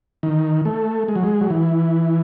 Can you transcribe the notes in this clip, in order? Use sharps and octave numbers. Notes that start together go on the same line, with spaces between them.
D#3
A3
G#3
F#3
G#3
F#3
E3